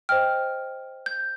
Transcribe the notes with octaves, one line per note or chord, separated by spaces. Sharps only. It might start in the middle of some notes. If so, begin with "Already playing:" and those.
C5 D#5 G5 F6
G6